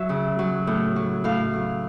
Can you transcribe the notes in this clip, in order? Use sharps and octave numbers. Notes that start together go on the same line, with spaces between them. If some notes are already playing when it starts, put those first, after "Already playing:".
Already playing: F#3 E5
C#3
F#3
A2
F#3
A2 F5
F#3